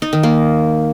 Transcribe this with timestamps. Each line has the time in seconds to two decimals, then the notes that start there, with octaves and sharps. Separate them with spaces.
0.02 D#4
0.13 D#3
0.23 A#3